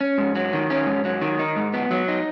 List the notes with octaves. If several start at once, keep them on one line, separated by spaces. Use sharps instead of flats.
C#4
G#2
F#3
D#3
C#4
G#2
F#3
D#3
D#4
G#2
B3
F#3
D#4